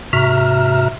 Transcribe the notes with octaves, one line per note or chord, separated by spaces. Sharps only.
G#2 C3 F#4 E5 A#5 F6